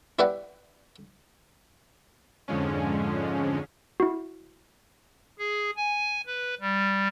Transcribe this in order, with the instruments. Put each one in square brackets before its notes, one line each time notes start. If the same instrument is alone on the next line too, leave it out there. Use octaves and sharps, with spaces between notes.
[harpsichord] E4 G4 B4 D5 F#5
[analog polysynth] F2 G#2 D3 F3 G#3 C#4
[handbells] E4 F#4
[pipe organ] G#4
G#5
B4
G3